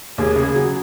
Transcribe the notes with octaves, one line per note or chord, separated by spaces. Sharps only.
D#2 G#4
C#3
F#3